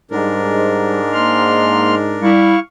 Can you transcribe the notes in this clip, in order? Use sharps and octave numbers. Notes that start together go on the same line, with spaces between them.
G#2 G3 D4 A#4
A#3 C6 F6
G3 E4 F5 C#6